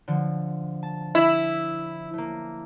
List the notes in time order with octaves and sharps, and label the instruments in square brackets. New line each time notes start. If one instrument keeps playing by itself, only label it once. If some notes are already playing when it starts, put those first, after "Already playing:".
[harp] D3 F3
A5
[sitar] E4
[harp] A3 A#3